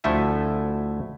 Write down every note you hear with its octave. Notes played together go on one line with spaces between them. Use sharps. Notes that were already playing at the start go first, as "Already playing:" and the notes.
D2 F3 A3 E4 E5 G#5